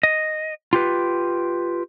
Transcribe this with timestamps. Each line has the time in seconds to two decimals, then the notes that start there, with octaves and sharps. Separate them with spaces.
0.03 D#5
0.73 F4 G4 B4